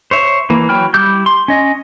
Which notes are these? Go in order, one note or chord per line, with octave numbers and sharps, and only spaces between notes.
C5 C#5 E5
E3 A#3
E3 F#3 G5 B5 F6
G3 E4 D6 E6 G6
C6
C#4 D#5